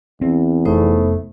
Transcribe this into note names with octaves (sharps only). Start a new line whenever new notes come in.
E2 C4
F1 A3 B3 D#4 C5